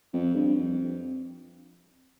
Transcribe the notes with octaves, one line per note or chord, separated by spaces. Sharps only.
F2
G2
F2